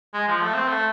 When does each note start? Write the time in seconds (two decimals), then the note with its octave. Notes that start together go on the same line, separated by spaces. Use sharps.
0.14 G#3
0.28 F3
0.42 A3
0.54 C4
0.68 A3